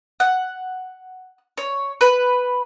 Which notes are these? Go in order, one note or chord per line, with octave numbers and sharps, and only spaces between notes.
F#5
C#5
B4